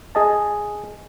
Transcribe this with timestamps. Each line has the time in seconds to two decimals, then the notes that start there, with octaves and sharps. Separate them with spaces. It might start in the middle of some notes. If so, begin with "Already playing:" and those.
0.15 G#4 D#5 A5